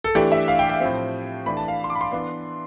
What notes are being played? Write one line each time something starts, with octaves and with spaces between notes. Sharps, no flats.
A4
E3 A3 D4 G4
E5
F5
G5
G5
A2 F3 C4
E3 A3 D4 B5
A5
F5
C6
D6
B5
C6
E3 B3 D4